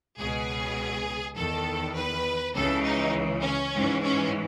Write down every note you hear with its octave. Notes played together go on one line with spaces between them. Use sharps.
C#2 B2 G#4
E2 D#3 A4
B4
C#2 C#3 E3 A4
D#4
C#4
G#2 E3
C#4